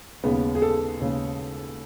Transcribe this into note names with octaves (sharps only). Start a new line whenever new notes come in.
D#2 C#3 G#3 B3
G#4
A4
D#2 C#3 G#3